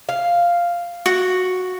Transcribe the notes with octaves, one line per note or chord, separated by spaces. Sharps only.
F5
F#4